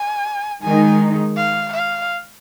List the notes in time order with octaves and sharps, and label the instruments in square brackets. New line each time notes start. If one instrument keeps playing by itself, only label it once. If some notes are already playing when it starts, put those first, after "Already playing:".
Already playing: [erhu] G#5
[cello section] D#3 G#3 D#4 [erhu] G#5
[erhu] F5
F5